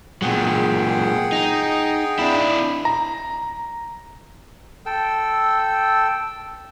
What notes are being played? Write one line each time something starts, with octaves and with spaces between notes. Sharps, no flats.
A#2 F#3 G#4 F#5 G5
D#4
D4 E4
A#5
A4 G5 E6